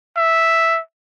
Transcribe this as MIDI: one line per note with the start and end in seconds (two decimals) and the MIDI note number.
0.17 0.80 76